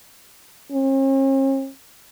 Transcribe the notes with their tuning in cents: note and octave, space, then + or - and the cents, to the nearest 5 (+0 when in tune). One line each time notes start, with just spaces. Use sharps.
C#4 -45